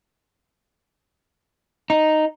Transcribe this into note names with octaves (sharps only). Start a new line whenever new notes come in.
D#4